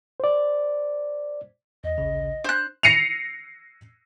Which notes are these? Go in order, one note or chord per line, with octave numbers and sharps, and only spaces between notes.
C5 D5
E2 D#5
A1 D2 C#3
D4 C5 F#6
A#6 C7 C#7 D#7 F7